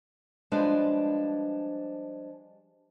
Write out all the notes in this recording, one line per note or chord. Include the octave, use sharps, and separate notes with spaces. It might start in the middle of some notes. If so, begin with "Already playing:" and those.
F3 G3 G#3 D4 B4